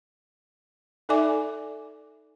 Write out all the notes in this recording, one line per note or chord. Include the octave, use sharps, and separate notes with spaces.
D#4 A4 D5 E5 G#5 D6